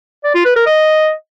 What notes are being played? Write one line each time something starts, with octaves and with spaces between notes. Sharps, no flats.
D5
F4
B4
A#4
D#5